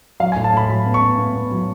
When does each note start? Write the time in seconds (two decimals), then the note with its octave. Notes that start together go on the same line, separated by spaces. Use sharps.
0.20 F#3 F5
0.32 G#5
0.36 A2
0.44 A5
0.53 A2 B5
0.69 F#3 B5
0.86 B3
0.94 C#6
1.02 B3
1.18 B3
1.36 B3
1.51 F#3